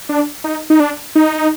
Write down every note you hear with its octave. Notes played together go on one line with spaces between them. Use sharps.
D4
D#4
D#4
D4
D#4